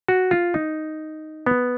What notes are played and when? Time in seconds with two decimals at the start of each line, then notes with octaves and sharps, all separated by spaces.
0.08 F#4
0.31 F4
0.54 D#4
1.46 B3